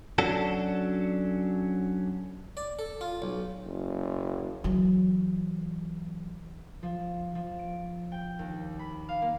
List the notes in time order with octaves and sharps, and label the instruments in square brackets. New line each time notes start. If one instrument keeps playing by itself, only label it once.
[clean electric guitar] F#3 C#4 D4 F#4 A4
[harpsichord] D5
A4
F4
B1
[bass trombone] F#1
[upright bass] E3 F#3
[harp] F3
F3
D7
G5
D#2
B5
F5
A#3